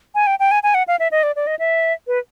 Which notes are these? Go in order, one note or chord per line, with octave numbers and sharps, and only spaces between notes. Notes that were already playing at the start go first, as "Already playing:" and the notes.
G#5
G5
G5
G#5
G#5
F#5
F5
E5
D#5
D5
D5
D#5
E5
B4